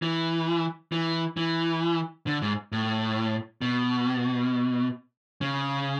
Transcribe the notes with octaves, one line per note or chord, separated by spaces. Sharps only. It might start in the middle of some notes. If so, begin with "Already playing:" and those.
E3
E3
E3
D3
G#2
A2
B2
C#3